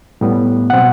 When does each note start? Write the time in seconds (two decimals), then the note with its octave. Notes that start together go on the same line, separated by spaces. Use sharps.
0.21 A2 G3 B3
0.70 B2 F#3 C4 F#5